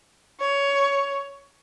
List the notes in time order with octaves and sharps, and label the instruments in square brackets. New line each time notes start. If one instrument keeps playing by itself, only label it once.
[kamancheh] C#5